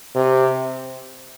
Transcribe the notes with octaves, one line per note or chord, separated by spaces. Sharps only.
C3